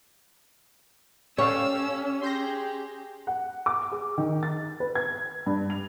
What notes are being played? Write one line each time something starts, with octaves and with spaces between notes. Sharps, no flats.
C#4 G4 A4 C#5 F5 E6
G4 G#4 C6 G6 A#6
F#5
D6
G#4
D#3
A6
B4
G#6
G2
F7